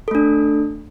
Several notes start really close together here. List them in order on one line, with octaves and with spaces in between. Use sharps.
A4 A3 D4